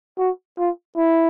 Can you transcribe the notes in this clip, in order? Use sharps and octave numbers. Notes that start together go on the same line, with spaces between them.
F#4
F4
E4